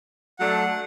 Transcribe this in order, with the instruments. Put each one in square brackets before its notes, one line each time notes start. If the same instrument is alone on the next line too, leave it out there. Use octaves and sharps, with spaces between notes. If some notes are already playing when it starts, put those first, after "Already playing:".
[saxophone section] F#3 A3 D4 A4 D5 [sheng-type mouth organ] F#5